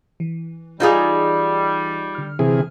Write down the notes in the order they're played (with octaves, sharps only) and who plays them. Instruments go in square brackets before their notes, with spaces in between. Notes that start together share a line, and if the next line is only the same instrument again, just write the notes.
[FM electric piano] E3
[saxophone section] G3 [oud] D#4 F4 G#4
[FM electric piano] D3 F6
[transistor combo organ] C3 E3 G#4